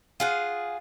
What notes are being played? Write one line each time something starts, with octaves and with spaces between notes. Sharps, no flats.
F4 G#4 F#5